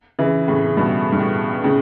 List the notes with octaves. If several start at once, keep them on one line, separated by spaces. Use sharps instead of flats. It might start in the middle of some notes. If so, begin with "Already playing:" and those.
C#3 E3
A2 C#3
C#3
G2 B2
G2
A2
A2 C#3